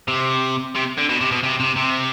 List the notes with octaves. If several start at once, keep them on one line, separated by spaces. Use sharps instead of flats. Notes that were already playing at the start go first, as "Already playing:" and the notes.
C3
C3
D3
B2
C3
B2
C3
C3
C3